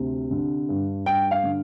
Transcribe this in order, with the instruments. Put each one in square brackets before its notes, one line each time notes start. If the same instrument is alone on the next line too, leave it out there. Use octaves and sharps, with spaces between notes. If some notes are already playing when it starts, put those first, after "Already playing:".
Already playing: [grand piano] D2 C3
D3
G2
G2 G5
F5
D3